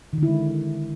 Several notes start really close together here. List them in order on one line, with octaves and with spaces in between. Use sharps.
D#3 D3 E4 G#3